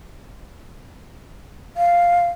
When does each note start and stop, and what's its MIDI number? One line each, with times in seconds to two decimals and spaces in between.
1.77 2.26 77